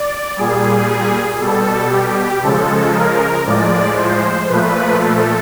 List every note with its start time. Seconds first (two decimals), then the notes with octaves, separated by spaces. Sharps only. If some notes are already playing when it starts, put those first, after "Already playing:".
Already playing: D5
0.36 A#2 G3 G#4
1.39 B2 G3 A4
1.91 G4
2.42 C#3 F3 G#3 A4
2.94 A#4
3.45 A2 F3 G#3 D5
3.97 C5
4.48 A#2 F3 A3 B4
5.00 A4